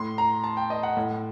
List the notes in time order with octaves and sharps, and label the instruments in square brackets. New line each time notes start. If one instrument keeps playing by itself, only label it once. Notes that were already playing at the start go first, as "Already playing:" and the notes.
Already playing: [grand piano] A2 C6
A#5
A5
G5
D#5
F#5
A2